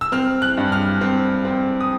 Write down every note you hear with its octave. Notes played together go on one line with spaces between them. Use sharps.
E6
C4 F6
F#6
G2
F6
C4
C4
D#6